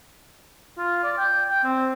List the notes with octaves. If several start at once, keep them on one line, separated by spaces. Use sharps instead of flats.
F4
D5
G5
G5
C4